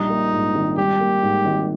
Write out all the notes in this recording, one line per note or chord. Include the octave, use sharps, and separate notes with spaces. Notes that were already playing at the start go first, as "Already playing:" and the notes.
Already playing: A#1 G3 D#4
A#3
G#2
G#1
G3 G4
A#3
G#2
G#1